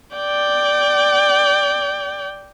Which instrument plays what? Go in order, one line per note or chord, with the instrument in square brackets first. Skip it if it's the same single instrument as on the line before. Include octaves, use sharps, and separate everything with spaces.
[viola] D5 G5